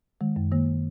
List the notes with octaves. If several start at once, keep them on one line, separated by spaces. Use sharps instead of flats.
D#3 G#3
F#2
D#3 A#3